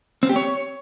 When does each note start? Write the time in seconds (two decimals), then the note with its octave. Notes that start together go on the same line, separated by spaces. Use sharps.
0.23 C4
0.29 G4
0.36 C#5